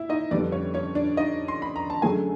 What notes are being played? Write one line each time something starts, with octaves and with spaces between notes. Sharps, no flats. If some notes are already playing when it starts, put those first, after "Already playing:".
Already playing: E4 E5
D#4 D#5
F2 D3 G3 B3 D4 D5
C#4 C#5
C#4 C#5
D4 D5
D#4 D#5
C6
B5
A#5
A5
F#2 D3 F#3 A3 G#4 G#5